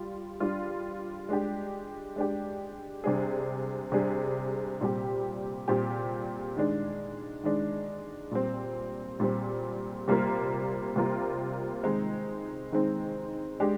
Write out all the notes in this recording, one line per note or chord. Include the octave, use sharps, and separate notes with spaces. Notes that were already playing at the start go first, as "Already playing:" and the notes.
Already playing: G3 F4
G3 D4 F4
G#3 D4 G4
G#3 D4 G4
C3 G3 D4 G#4
C3 G3 D4 G#4
A#2 G3 C4 G4
A#2 G3 C4 G4
D#3 G#3 D4
D#3 G#3 D4
A#2 G3 C4
A#2 G3 C4
C3 G3 A#3 F4 A#4
C3 G3 A#3 F4 A#4
D#3 G#3 C4 D#4
D#3 G#3 C4 D#4
G#3 D4 G4